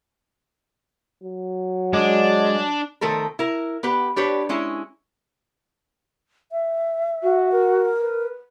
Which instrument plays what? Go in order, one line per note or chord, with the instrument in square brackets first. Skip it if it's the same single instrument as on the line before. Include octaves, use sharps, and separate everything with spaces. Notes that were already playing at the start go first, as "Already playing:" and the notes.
[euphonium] F#3
[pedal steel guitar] G#3 [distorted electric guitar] D4
[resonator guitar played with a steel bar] D#3 F3 A3 A4 A#4
E4 A#4
B3 G4 B4
D4 G4 B4 C#5
G#3 C#4 E4
[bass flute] E5
[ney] F#4
[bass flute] A#4
[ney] B4